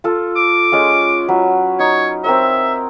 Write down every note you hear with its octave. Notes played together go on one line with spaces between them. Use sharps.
F4 A4
D6
G#3 C#4 F4
F#3 B4
D#4 C#5
C4 A#4 C#5 E5